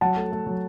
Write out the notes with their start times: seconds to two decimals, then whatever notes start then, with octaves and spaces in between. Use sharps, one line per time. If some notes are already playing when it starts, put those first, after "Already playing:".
0.01 F#3 F#5 A5
0.17 A3
0.32 A3
0.47 F#3